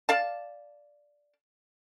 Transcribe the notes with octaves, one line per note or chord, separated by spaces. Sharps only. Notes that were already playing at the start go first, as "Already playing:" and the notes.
D5 F5 A5